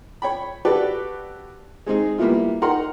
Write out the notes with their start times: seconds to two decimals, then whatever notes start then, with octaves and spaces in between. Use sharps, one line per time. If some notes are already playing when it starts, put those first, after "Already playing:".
0.22 C#5 G5 B5
0.65 F#4 G4 A4 B4 D5
1.86 G#3 C4 D#4 G#4
2.18 G3 A#3 B3 E4 F4
2.62 D#4 A#4 F#5 G5 A#5 C6